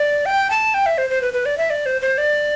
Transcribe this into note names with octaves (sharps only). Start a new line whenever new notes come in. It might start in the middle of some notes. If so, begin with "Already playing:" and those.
Already playing: D5
G5
A5
G5
E5
C5
C5
B4
B4
D5
E5
D5
C5
C5
D5